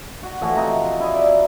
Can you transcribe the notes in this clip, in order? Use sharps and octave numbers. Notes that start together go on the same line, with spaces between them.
F#4
A2 E3 F3 F#4
C3 D#5 A#5 C#6
E4 D#5
D5 E5